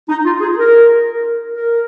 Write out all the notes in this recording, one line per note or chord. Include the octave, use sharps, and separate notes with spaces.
D#4
F4
G#4
A#4
A#4